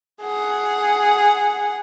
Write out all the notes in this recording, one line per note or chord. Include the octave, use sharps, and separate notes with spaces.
G#4 F#5